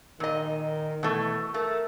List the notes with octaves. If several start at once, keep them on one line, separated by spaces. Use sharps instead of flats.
A#2 D#3 D#5
B2 E3 A3
A3 A#4